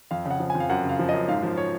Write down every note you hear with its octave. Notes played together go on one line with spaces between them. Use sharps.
F2 F5
C#3
F#5
F3
F2 G#5
F5
F#2 F#5
C#3
F5
F3
F#2 D#5
G#2 F5
F3
C#5